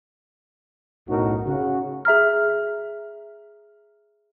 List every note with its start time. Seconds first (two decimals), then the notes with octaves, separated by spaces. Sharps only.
1.08 B1 F#2 A2 D#4 F#4 A#4
1.47 C#3 F#4
2.05 G#4 E5 A#5 F6